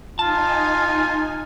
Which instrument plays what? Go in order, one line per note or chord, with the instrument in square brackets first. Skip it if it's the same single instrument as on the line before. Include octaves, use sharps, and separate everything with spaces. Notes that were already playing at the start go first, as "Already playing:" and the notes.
[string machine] D#4 G#5 [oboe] F4 [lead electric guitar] A5